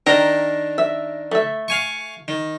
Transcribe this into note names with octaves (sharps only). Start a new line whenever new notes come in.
D#3 D4 A#4 G5 A#5
E5
A3 E5
F5 G#5 C#6
D#3